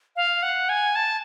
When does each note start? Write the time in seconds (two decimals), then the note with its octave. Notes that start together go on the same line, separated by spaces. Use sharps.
0.16 F5
0.43 F#5
0.69 G#5
0.96 A5